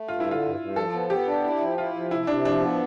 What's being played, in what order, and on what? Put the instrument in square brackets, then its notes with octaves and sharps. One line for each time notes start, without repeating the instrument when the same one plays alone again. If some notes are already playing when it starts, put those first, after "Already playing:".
Already playing: [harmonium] A3
[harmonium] G2 [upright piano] F4
[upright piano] E4
[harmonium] D3
[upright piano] F4
[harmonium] G2
G2
[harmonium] F3 [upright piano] A4
[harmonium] B3
[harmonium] B3 [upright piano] G4
[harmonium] D4
E4
F3
[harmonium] E4 [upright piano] F4
[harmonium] F3
[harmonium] C3 [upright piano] E4
[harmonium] C3 [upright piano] D4
[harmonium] F3 [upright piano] D4
[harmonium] B3